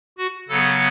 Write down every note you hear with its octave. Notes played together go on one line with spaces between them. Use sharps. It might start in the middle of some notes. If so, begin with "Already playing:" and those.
F#4
C#3 F#3 B3 A4